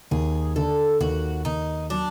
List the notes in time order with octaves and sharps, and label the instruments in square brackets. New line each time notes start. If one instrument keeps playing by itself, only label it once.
[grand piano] D#2 [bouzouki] G#4
[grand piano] D3 [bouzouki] A4
[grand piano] D#2 [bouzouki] F#4
[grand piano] D#2 [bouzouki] D#4
[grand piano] F#3 [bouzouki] D4